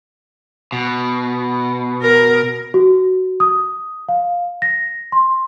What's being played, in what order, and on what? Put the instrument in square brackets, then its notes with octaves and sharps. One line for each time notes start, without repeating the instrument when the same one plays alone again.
[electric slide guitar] B2
[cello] A#4
[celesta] F#4
D#6
F5
A#6
C6